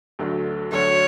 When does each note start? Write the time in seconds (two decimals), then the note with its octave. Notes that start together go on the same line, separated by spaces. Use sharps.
0.19 D2 D3 F#3 A3
0.72 D2 D3 F#3 A3 C#5